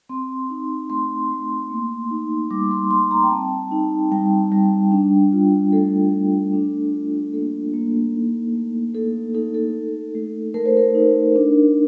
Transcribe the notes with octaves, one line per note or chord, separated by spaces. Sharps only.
C4 C6
D#4
A3 C6
A3
A#3
D#4
G3 D6
C6
G3 C6
A#5
G5
C4 A5
D#4
G3 G5
G3
D4
F4
A3 A4
A3
D4
F4
A#3 A4
A#3
D#4
A3
A3 A4
D#4 A4
A4
D#4
A3
A3 A#4
C5
A#4
D#4
D4